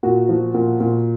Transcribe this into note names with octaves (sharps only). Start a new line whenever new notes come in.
A#2 F#4
F3
A#2
A#2